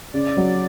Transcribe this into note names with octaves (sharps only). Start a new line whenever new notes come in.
C#3 D5
F#3